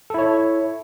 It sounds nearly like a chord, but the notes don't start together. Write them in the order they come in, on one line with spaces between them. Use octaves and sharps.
A4 E4 C#5